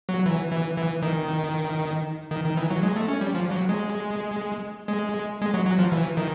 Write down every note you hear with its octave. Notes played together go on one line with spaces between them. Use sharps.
F#3
E3
E3
E3
D#3
D#3
D#3
E3
F#3
G#3
A3
C#4
G3
F3
F#3
G#3
G#3
G#3
F#3
F#3
F3
E3
D#3